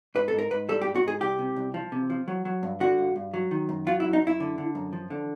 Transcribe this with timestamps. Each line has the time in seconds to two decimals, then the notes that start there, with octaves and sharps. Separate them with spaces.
0.15 G#2 B4
0.28 G#2 A4
0.39 A#4
0.51 G#2 B4
0.69 G3 A4
0.82 G4
0.87 G#2
0.95 F#4
1.03 G#2 G#4
1.21 C2 G4
1.39 C3
1.56 C2
1.74 F3
1.92 C3
2.10 F3
2.28 F#3
2.45 F#3
2.63 G2
2.80 D3 F#4
2.98 G2
3.16 G2
3.34 F#3
3.51 D#3
3.69 F#2
3.87 F#3 F4
4.00 E4
4.04 F#2
4.13 D#4
4.22 F#2 E4
4.40 D3
4.58 D3
4.75 F#2
4.93 F3
5.10 D3